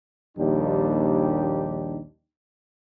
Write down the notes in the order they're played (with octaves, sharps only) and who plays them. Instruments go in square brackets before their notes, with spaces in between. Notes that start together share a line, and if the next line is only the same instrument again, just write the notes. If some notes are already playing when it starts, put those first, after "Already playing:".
[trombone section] A#1 D#2 G3 D4 D#4 G4